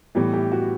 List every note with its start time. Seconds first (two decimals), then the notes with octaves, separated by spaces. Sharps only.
0.15 A2 E3 G3 B3 G4
0.33 G4
0.52 F#4